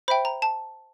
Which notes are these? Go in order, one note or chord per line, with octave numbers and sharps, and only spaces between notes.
C5 E5 G5 B5
A#5
A5